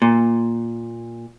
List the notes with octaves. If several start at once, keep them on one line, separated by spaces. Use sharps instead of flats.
A#2